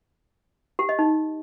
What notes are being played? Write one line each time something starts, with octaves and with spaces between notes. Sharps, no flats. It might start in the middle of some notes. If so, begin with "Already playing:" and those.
G4
D#5
D#4